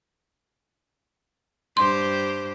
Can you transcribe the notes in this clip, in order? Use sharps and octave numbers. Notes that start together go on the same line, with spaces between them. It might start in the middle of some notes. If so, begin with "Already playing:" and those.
G2 G4 C5 C6